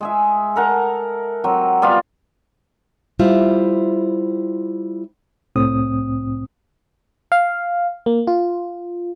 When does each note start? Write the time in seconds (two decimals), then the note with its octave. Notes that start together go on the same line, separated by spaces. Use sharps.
0.01 G#3 G#4 E5
0.56 A4 A#4 F#5
1.44 F#3 C4
1.82 G3 B3 F4 F5
3.19 G3 E4 F4 C5
5.56 C2 A2 C4 D#6
7.32 F5
8.06 A#3
8.27 F4